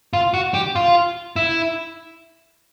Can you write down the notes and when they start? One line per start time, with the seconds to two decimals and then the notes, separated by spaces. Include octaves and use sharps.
0.13 F4
0.34 F#4
0.54 G4
0.76 F4
1.36 E4